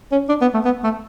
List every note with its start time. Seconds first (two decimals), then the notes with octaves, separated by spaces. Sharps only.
0.11 C#4
0.29 D4
0.41 B3
0.54 A3
0.65 B3
0.83 A3